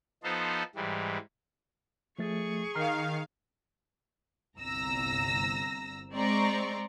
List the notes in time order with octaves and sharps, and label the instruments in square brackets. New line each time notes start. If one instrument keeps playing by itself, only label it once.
[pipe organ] F3 B3 D#4 A4 C5
G#2 E3 G3
[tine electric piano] F3 A3 A6 [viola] G#4 C#6
[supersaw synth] D#3 F5 [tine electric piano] A#5 F6 C7
[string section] G1 C2 A#5 E6 A#6
G#3 C4 D5 A#5 C6 C#6